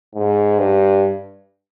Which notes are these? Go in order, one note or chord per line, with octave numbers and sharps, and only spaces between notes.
G#2
G2